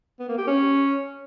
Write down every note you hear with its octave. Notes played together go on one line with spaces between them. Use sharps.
B3
A#3
G4
C#4